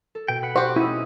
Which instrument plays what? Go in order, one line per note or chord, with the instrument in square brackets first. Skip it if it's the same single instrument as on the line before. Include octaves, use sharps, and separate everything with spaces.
[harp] A4
[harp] B2 [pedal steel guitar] G5
[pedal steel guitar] B4 F#5
[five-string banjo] F#4 G4 [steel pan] C5
[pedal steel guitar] C#4 D#4 [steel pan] E4